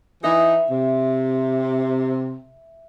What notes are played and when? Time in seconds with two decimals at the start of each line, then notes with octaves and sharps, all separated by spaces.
0.24 E3 D#4 E5
0.71 C3